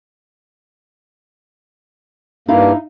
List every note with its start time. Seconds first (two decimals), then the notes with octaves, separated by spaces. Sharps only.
2.48 G2 A#3 D#4 E4 F5